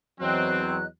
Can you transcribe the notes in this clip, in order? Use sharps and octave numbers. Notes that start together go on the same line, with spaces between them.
E2 E3 F#3 C4 D#5 F#6